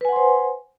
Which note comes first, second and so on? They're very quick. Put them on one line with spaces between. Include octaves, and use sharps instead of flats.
B4 G#5 F#5 C6 C5